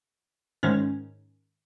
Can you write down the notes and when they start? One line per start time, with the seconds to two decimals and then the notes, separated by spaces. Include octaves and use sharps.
0.63 G#2 D#3 G#3 C#4